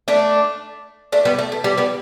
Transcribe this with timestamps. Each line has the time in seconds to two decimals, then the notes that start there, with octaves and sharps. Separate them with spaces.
0.08 A3 D4
1.12 A3 D4
1.25 G3 B3
1.39 A3
1.52 A3
1.64 G3 B3
1.77 G3 B3